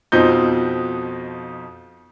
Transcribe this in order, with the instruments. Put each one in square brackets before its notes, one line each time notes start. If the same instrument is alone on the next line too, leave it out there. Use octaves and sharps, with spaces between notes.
[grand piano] F2 B2 F3 D#4 G6